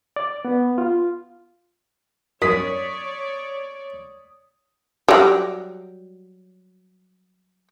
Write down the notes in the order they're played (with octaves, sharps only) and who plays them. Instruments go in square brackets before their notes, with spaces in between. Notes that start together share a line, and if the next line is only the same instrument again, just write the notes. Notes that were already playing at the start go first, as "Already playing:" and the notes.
[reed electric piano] D5
B3
F4
[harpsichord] F#2 [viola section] C#5 D5 [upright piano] D#6 B6
[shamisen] F#3 G3